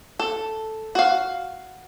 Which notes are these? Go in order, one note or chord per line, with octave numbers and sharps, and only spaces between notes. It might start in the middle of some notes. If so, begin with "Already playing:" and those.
A4
F#4 F5